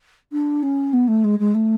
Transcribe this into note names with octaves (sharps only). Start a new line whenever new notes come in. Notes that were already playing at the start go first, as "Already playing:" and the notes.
D4
C#4
B3
A3
G#3
G#3
A3